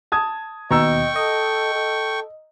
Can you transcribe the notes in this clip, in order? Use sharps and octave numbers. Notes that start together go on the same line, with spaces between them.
A5 D#6 G#6
D#2 B2 D#5 G5 A#5 C#6 E6
A4 D#5
A4